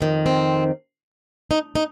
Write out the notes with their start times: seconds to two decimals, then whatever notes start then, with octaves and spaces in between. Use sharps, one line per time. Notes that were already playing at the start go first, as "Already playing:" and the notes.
0.01 F2 D#3
0.26 C4
1.51 D#4
1.75 D#4